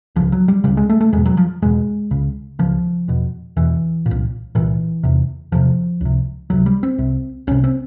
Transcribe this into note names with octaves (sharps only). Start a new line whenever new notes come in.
C#2 C#3 F3
F#3
G3
C#2 C#3 G3
G#3
A3
A3
E2 B2 G#3
F#3
F3
E2 B2 G#3
C#2 C#3
C#2 C#3 F3
E2 B2
E2 B2 E3
A#2
C2
C2 A#2 E3
E2 C3
E2 C3 F3
C#2 C3
C#2 C3 F#3
G3
C4
C2 C3
C2 C3 C#4
C4